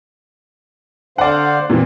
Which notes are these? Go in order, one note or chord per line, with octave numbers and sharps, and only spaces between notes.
D3 C5 D5 F5 F#5
A#2 E3 C4